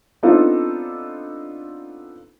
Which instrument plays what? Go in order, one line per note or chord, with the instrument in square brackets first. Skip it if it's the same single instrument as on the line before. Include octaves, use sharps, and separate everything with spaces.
[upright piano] B3 C4 D4 D#4 F4 A4